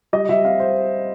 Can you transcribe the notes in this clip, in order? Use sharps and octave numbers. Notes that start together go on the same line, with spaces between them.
G3 D#5
G3 E5
C4 F5
C5